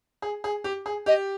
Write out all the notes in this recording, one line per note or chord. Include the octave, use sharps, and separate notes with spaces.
G#4
G#4
G4
G#4
G4 D#5